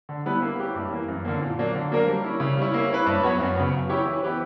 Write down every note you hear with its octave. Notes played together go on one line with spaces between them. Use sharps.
D3
G3 B3 E4 B4
A#3
C#4 E4 G4 B4
G2
E3 A#3
F#2
D3 A#3
A#2
F#3 A#3 D4
D3
F#3 A#3 D4 A#4
G3
C#4 E4
C#3
G3 C#4 E4
A#3
C#4 E4 B4
G2
F#3 B3 F#4 C#5
F#2
C#3 F#3 B3
F#3
C#4 E4 G4 C#5
E3
B3 E4 G4 B4